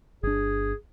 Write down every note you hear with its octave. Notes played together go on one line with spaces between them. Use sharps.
G1 D4 G#4